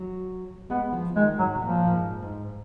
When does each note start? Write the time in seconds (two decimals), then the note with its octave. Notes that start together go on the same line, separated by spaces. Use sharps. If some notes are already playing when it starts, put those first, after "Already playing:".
Already playing: F#3
0.70 G#3 B3
0.93 F3
1.16 D#3 G#3
1.39 G#2 F#3
1.55 B2
1.61 A#2 F3
1.87 A#2
1.92 G#2
2.22 G#2